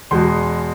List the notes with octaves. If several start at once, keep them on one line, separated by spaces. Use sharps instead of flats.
E2 B2 G#3 C6